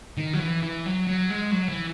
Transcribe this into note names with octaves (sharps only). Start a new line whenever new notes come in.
D#3
F#3
E3
E3
F#3
F#3
G#3
F#3
E3